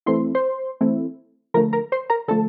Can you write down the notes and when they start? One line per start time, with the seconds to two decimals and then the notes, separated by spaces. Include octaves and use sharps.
0.06 E3 A3 C4 E4 C6
0.35 C5 C6
0.81 E3 A3 C4 E4
1.54 D3 F3 A3 A#4 A#5
1.73 A#4 A#5
1.92 C5 C6
2.10 A#4 A#5
2.28 D3 F3 A3 A4 A5